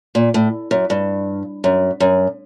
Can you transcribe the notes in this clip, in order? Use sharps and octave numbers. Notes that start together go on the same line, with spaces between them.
A#2
A2
F#2
G2
F#2
F#2